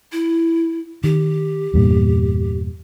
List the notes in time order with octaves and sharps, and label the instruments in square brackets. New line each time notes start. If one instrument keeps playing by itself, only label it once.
[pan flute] E4
[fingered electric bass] D#3 [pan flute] G4
[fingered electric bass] E2 G2 A#2